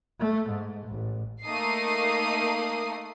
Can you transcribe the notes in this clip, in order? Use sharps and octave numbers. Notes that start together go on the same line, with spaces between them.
A3
G#2
A1
A3 A#3 D#4 D#6 C7